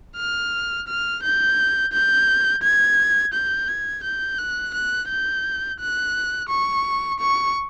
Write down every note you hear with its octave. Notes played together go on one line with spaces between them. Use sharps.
F6
F6
G6
G6
G#6
G6
G#6
G6
F#6
F#6
G6
F#6
C#6
C#6